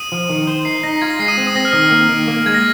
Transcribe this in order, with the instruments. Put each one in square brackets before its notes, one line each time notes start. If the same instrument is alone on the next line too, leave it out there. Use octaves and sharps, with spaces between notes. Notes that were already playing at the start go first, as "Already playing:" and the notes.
Already playing: [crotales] D#6 D#7
[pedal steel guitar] F3
D#3
C5
[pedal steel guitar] D#4 [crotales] C7
[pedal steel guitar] D#4 [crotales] A#6
[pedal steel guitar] F4 [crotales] G#6
[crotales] A#6
[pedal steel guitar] G#3 [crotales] C7
[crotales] D#6 D#7
[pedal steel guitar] C4
[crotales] D#6 D#7
[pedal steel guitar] C4 [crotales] A#6
[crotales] F6
[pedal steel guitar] D#3 [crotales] D#6
[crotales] F6
[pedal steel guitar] A#3
D#3
A#3
[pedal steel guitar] G#3 [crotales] G#6
[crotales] A#6